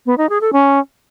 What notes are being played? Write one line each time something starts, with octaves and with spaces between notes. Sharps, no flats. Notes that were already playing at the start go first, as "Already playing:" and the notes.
B3
D#4
G#4
A4
C#4